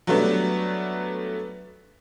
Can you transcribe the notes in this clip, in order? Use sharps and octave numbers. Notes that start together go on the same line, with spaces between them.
F#3 G3 A3 B3 D4